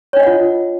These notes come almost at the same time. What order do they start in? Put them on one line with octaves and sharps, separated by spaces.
C#5 D4 D#5 F#5 F4